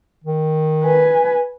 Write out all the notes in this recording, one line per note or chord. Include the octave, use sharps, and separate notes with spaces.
D#3
B4 G#5